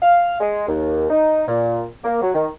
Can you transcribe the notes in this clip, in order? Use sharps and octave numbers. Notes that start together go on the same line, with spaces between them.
F5
G#3
D#2
D#4
A#2
A#3
F#3
D#3